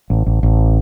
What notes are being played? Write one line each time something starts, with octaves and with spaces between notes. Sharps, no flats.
A1
A1
A1